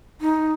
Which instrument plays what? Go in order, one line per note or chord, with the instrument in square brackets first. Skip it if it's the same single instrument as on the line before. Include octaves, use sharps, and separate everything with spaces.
[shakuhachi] D#4